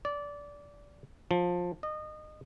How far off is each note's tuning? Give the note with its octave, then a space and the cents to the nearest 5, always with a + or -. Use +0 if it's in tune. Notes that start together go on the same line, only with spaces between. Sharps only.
D5 -20
F3 +15
D#5 -25